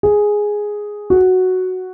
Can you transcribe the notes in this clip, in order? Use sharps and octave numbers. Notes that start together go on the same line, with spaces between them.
G#4
F#4